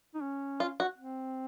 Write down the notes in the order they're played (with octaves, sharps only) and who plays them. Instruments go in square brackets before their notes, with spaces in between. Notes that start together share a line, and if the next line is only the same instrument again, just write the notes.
[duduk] D#4
C#4
[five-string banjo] F4
F#4
[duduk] C4